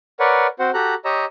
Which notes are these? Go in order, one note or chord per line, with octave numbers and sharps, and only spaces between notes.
A#4 B4 C#5 D5 F#5
C4 F#4 C5 F#5
F#4 G4 A4 A#5 F#6
G4 C#5 D#5 A#5 E6